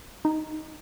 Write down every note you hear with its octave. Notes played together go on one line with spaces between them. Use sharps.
D#4